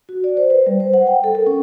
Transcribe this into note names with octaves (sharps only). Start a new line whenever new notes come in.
F#4
D5
C5
B4
G3
C5
F#5
G5
A4
A#4
C#4